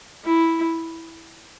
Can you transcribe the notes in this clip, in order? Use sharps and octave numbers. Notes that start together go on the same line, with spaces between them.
E4